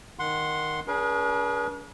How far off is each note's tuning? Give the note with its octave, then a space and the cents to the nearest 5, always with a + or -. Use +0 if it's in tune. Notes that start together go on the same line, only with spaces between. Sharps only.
D#3 +0 F#5 -15 C6 +0
D4 -40 G#4 +0 B4 -45